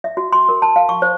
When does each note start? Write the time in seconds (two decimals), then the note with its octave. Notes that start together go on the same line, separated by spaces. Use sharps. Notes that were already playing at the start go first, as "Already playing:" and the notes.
0.04 E5
0.17 F#4
0.32 C6
0.49 A#4
0.62 A5
0.76 F5
0.89 C#6
1.02 C5